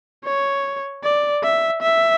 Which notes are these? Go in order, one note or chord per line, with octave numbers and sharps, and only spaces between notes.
C#5
D5
E5
E5